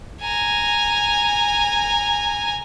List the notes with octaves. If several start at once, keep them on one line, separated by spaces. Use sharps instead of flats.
G#5 A#5